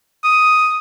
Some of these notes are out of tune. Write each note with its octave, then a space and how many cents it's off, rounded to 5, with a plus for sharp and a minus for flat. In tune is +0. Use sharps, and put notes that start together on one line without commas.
D#6 +5